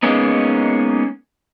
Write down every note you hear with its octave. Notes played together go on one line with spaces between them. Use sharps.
G#3 A#3 B3 C#4 D#4